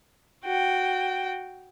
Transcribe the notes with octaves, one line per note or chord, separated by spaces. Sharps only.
F#4 G5